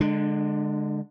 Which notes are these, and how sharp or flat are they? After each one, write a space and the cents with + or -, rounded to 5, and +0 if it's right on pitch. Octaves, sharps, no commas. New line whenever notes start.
D3 +0 G#3 +0 D4 +35